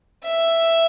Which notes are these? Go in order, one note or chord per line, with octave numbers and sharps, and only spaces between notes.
E5